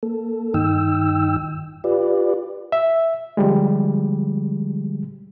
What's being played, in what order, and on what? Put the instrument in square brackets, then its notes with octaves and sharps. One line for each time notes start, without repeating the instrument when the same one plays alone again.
[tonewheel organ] A#3 A4
G2 D#3 D#4 G5 E6
F4 G4 B4 D5
[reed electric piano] E5
D3 F3 G3 G#3